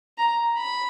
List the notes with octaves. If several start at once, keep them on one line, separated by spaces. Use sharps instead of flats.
A#5
B5